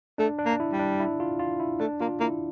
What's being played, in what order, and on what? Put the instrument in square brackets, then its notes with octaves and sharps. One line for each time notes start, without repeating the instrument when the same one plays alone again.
[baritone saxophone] A3 [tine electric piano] D4
[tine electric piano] D4
[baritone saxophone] A#3
[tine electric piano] E4
[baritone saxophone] G3
[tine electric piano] D4
E4
F4
F4
E4
[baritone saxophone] A3 [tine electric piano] D4
[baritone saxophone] A#3 [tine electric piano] F4
[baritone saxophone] A#3 [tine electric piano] E4